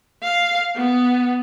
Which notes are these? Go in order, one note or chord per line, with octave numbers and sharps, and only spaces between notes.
F5
B3